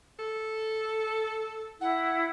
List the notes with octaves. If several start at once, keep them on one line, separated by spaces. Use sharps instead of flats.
A4
E4 F#5